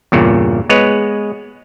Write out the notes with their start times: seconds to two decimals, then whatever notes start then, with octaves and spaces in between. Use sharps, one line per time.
0.12 E2 G2 A#2 C#3
0.69 G#3 B3 B4 C#5